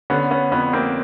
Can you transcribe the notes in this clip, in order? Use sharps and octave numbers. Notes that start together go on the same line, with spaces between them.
D3 B3 C#4
B3 C#4
F2 B3 C#4
A#3 C4